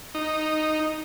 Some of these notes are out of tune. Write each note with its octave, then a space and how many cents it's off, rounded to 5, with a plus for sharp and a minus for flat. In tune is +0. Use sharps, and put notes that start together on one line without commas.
D#4 -5